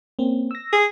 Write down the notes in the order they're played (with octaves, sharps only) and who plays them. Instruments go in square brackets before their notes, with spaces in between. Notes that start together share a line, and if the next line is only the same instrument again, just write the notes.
[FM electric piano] A#3 C4 C#4
E6 A#6
[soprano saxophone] G#4